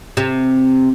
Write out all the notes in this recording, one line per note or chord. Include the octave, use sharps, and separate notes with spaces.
C3